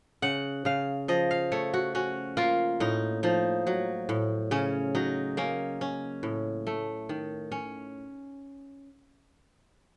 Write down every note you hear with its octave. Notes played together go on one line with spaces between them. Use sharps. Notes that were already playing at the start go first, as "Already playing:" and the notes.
C#3 F#5
C#3 F5
F3 D#5
F5
A3 C#5
F#4
C#4 F#4
A#3 F4
A2 D#4
F3 D#4
F#3
A2
C#3 C#4
F#3 D#4
A#3 C#4
C#4
A2
A3
D#3
C#4